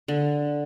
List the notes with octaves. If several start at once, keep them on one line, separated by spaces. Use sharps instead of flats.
D3